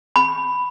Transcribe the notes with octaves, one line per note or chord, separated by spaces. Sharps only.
B5